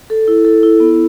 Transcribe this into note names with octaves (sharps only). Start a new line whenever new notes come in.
A4
E4
A4
E4
B3